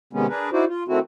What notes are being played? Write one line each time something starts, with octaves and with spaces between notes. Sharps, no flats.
C3 D#3 G#3 B3 C#4
D4 G#4 A#4 B4
D#4 E4 F#4 C5 D5
F4
D#3 A3 C4 E4 F#4